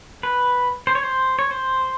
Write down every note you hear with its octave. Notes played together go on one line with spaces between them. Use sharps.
B4
C5
C#5
C5
C#5
C5